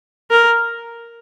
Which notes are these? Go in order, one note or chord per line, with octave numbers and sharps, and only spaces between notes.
A#4